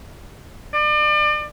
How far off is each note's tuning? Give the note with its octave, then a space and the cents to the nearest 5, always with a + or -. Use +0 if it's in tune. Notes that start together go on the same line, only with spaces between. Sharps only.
D5 +35